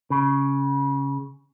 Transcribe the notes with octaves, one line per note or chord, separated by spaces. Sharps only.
C#3